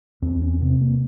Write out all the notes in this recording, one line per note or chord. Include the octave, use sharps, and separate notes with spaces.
E2 C4
C#4
C3 C4
A#3